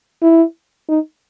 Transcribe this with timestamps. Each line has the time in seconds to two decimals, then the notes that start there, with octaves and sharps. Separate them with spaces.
0.22 E4
0.89 D#4